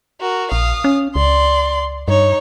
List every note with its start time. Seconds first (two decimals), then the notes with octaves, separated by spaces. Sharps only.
0.20 F#4 A#4
0.52 A#1 F5 D#6
0.84 C#4
1.16 C#2 D5 C6
2.08 G2 D#4 C#5